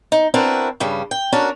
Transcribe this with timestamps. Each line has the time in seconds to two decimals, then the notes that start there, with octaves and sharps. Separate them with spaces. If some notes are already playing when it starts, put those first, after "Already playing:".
0.12 D#4
0.34 C4 D4 E4 F#4 A#4 B4
0.80 G2 C#3 G3
1.11 G5
1.33 C#4 D4 F#4 A4 A#4